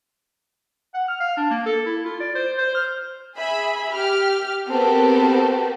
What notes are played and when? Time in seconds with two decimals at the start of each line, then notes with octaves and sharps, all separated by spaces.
0.94 F#5
1.08 F6
1.20 F5
1.37 D4
1.51 A#3
1.66 A4
1.86 E4
2.05 F4
2.20 D5
2.35 C5
2.58 C5
2.75 F6
3.38 G#4 E5 B5
3.91 G4 F6
4.69 B3 C4 F#4 G4 A4 A#4